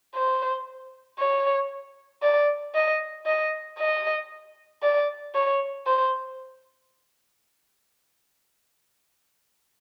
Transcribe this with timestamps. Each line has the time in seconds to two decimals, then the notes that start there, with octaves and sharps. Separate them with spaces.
0.15 C5
1.19 C#5
2.23 D5
2.75 D#5
3.26 D#5
3.79 D#5
4.83 D5
5.35 C#5
5.87 C5